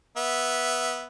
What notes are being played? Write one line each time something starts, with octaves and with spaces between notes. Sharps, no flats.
B3 E5